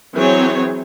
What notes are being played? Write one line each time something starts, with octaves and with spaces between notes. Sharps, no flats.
E3 F#3 C4 G#4 C#5